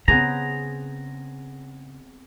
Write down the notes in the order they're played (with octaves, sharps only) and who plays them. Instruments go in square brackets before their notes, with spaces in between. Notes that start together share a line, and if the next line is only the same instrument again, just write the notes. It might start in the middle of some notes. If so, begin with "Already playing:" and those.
[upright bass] C#3 [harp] B3 C4 G#4 [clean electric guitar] A#5